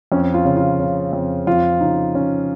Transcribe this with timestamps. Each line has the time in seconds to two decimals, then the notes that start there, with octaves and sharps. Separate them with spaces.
0.12 F2 C#4
0.34 F4
0.45 C#3
0.57 F4
0.79 C#3
1.13 F2
1.47 F2 F4
1.81 C#3 D#4
2.15 C#3 C#4